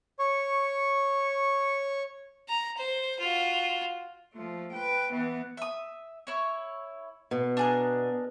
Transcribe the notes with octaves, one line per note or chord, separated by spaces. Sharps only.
C#5 C#6
A#5
C5
F4 F#4
F3 A3
B4 G5
E3 B3
E5 D#6
E4 C#5
B2
D4 G#4 A#4